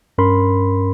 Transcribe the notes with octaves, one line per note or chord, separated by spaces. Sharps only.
G2 C#4 A#4 B5 C6